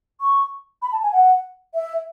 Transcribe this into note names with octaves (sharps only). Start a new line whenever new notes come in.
C#6
B5
A5
G#5
F#5
E5